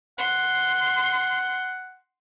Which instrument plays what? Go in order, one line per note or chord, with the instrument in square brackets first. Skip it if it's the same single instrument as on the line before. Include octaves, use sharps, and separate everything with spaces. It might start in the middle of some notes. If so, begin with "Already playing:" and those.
[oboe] F#5 [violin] C6